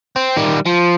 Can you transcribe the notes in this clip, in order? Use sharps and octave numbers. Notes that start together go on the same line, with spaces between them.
C4
D#3 G3
F3